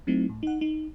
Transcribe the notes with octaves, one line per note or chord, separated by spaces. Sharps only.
F#3 A3 C4 D#4 E4
A2
D#4 F#5
D#4